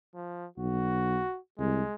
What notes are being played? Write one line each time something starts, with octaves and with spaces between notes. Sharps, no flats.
F3
B1 F#4
C2 G#3